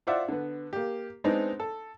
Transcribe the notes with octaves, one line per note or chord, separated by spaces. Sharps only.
F4 C5 D5 E5 F#5
D3 B3
A#3 G4
G#3 B3 C4 D4 D#4
A4